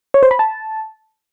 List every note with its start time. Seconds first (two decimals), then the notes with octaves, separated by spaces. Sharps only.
0.14 C#5
0.23 C5
0.31 B5
0.39 A5